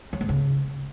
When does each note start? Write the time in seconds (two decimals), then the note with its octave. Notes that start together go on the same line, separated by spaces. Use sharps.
0.13 F#3
0.21 G#2
0.29 C#3